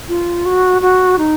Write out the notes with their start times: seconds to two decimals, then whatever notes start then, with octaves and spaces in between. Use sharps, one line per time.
0.09 F4
0.46 F#4
0.82 F#4
1.18 D#4